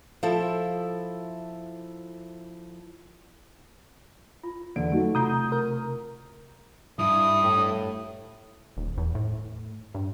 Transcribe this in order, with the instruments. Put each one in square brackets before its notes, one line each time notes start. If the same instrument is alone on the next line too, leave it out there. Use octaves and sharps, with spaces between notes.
[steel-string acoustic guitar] F3 E4 A4 E5
[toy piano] F4
[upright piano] E2 D3 D7 [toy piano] D5
[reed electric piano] F#3 D#4 F#4 [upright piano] A3 E4
[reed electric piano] C3 [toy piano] F4 F#5 A#5 [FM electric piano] D#6 G6
[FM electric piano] A#4
[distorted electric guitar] G2 [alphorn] E4 [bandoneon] D#6
[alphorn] A2
[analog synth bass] D#1
E2
A2
G2